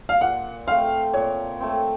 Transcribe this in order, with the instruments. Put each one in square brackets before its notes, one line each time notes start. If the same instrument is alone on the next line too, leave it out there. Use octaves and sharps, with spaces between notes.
[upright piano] F5
[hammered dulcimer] A#2 [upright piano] F#5
[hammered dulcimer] A3 C4 [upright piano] F5
[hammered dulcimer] A#2 [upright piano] C#5
[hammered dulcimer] A3 C4